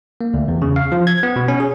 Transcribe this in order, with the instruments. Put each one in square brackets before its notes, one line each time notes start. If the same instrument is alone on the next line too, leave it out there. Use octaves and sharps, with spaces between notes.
[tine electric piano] A#3
D2
E2
C#3
F5
F3
G#6
B3
B2
C#4
G#4